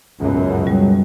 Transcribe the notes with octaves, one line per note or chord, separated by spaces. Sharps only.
C#2 F#2 B2
G3